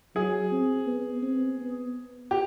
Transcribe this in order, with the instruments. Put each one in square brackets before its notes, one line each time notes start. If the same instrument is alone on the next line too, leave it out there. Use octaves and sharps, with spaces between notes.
[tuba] F#3 [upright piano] G#4
[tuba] C4
B3
C4
B3
[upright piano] G4